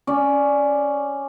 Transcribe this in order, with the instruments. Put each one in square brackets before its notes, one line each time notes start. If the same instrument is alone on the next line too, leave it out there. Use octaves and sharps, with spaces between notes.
[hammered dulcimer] C#4 D5